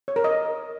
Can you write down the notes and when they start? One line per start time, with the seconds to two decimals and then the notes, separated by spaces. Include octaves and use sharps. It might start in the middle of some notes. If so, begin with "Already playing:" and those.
0.08 C#5
0.16 A#4
0.24 D#5